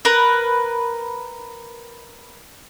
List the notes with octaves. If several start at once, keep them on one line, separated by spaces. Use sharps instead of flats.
A#4 B4